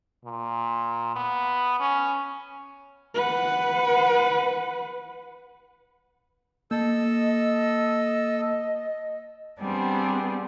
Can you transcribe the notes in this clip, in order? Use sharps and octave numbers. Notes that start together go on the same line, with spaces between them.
A#2
B3
C#4
B4 F#5
A#3 A4 D#5 E6
G3 B3 C4 D4 G#4